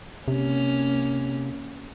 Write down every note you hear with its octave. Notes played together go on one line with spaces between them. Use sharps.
C3 A#3 C#4